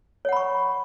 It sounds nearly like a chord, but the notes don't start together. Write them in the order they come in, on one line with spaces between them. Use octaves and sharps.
C#5 F#5 B5 C#6